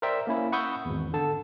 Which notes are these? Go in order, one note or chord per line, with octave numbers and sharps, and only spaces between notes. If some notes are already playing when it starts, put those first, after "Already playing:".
A#4 C5 D5 E5 G5
A#3 C#4 E4
F#5 B5 C#6 D#6 E6 G6
G#1 E2
D3 A4 A5